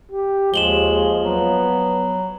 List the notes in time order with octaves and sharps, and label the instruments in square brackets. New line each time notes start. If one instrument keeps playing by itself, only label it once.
[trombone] G4
[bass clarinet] D#2 [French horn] F3 [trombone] G#3 [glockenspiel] E7 F#7 G7
[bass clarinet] F#3 [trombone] B3